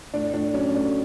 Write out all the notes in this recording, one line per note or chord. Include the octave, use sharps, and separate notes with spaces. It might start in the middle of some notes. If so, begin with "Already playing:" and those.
A2 D4
A2 D4
F#3 C#4
A3 D4